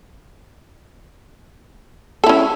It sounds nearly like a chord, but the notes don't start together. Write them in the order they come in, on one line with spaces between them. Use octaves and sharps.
A4 E4 C#4